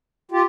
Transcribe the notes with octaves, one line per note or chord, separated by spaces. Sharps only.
F4 G4